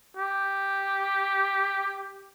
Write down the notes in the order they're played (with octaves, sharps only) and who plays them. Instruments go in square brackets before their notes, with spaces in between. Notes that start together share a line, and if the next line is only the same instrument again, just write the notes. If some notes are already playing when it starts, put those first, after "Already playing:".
[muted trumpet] G4